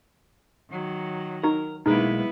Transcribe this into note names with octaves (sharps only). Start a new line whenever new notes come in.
D#3 F#3
D#4 F#4 A#4
B1 G#3 A#3 B3 D#4 E4 G#4 B4